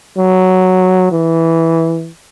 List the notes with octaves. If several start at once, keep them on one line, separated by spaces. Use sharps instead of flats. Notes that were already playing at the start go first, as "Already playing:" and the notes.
F#3
E3